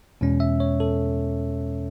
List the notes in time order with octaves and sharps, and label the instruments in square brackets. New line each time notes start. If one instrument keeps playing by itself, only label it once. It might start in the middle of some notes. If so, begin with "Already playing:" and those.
[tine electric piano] E2 B2 G#3 C#4
E5
C#5
A4